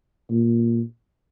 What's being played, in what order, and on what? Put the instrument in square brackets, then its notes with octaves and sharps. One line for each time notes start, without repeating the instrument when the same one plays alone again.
[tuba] A#2